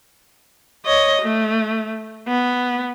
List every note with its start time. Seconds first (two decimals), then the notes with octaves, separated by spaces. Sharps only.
0.86 C#5 D#5
1.22 A3
2.27 B3